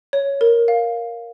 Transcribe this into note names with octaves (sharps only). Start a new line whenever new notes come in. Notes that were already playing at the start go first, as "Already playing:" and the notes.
C#5
A#4
F5